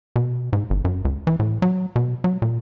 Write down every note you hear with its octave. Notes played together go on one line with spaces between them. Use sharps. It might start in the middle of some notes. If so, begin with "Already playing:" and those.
B2
G#2
G1
F#2
C#2
E3
A2
F#3
B2
F#3
A#2